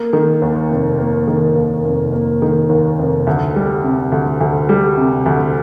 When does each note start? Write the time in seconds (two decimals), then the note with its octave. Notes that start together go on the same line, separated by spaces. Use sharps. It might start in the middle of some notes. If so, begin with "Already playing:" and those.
Already playing: A#3
0.13 D#3
0.42 D#2
0.71 F1
0.99 A#3
1.28 D#3
1.56 D#2
1.85 F1
2.13 A#3
2.42 D#3
2.69 D#2
2.99 F1
3.27 D2
3.56 G3
3.84 C3
4.12 D2
4.41 D2
4.69 G3
4.97 C3
5.26 D2